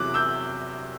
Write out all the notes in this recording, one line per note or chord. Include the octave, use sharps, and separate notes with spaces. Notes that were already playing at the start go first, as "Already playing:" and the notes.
Already playing: E2 C3 F#3 D6 F#6
E6 G6